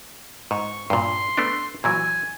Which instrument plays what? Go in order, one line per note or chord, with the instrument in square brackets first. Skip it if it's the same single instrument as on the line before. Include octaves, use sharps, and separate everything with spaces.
[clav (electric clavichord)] G#2 [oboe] C#6
[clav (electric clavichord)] G2 A#2 [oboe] C6
[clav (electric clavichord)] A3 B3 D4
[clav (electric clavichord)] A#2 E3 F#3 [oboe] G#5